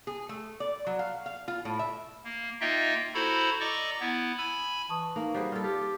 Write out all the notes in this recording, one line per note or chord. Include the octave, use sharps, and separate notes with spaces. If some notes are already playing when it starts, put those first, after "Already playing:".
G#4
A3
D5
F#3
F5
F5
F4
A2
E5
A#3
A#3 D#4 F4 D#5 E5 G5
E4 F#4 A4 C5 A#5 B5
D5 D#5 A#5 C#6 D6 E6
B3 E4
G#5 B5 E6
E3 A5 C#6 D#6
A#3 D#4 B4 F5
G3 F#4 G#4 C5
G3 F4 A4
F4 G4